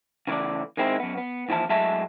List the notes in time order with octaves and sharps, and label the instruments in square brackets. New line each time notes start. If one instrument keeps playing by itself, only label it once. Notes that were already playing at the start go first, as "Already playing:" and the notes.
[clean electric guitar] C#3 E3 G#3 A3 D5
D#3 G#3 C4 E4
F#2 B3
B3
D#2 E3 F3 E4 A5
A2 F#3 G#3 E5 A5